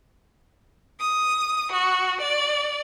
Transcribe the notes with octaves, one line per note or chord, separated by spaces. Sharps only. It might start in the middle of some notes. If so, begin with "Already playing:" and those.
D#6
F#4
D5